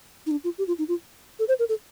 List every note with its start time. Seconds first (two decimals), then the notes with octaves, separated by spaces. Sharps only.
0.26 D#4
0.31 D4
0.44 F4
0.58 G4
0.68 F4
0.79 D#4
0.88 F4
1.39 A4
1.48 C5
1.59 A#4
1.69 A4